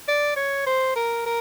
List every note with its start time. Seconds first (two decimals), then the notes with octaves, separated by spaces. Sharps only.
0.08 D5
0.36 C#5
0.66 C5
0.96 A#4
1.26 A#4